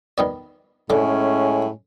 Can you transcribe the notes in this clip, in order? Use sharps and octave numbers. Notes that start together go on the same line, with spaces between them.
D#3 B3 D5
A2 D3 G#3 C#4 D6